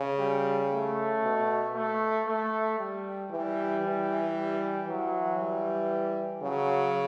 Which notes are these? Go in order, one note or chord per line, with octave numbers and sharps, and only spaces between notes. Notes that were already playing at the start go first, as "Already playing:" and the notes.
Already playing: C#3
G3
A3
B2
A3
A3
G3
E3 G3
E3
G3
E3 F#3
G3
C#3 F#3